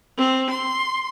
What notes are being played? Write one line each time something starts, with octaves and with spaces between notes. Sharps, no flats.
C4
C6